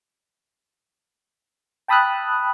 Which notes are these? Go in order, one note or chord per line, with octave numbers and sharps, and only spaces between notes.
G5 A5 B5 D#6 E6 F#6